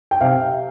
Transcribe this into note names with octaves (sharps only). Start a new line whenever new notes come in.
G5
C3 F5